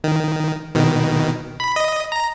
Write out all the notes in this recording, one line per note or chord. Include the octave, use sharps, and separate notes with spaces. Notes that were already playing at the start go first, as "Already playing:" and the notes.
D#3
B2 D#3
B5
D#5
A#5